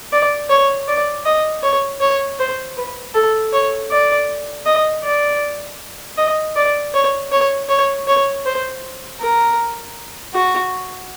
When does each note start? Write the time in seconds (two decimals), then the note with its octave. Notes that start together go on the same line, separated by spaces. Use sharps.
0.12 D5
0.50 C#5
0.88 D5
1.25 D#5
1.63 C#5
2.01 C#5
2.39 C5
2.77 B4
3.14 A4
3.53 C#5
3.91 D5
4.66 D#5
5.04 D5
6.18 D#5
6.56 D5
6.94 C#5
7.32 C#5
7.69 C#5
8.07 C#5
8.46 C5
9.20 A#4
10.34 F#4